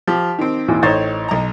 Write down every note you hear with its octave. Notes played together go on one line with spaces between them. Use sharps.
F3 G4
D#3 C4
D#2 A#2 E3
A1 D#4 C5 C#5 A6
B1 A#5